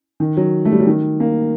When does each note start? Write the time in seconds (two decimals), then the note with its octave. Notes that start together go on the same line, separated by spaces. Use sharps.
0.20 D#3
0.37 F#3
0.65 A3
0.72 G3
0.79 F#3
0.87 D#3
1.20 A#3